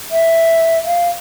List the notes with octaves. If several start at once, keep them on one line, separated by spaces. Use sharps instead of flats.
E5
F5